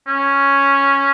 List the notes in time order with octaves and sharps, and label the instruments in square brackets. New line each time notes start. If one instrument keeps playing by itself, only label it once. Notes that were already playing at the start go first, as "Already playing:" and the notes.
[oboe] C#4